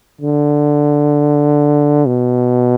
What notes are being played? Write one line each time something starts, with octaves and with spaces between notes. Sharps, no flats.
D3
B2